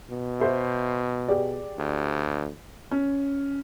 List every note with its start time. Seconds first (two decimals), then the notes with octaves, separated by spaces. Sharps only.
0.10 B2
0.40 C5 E5
1.28 G4 G#4 D5
1.78 D2
2.91 C#4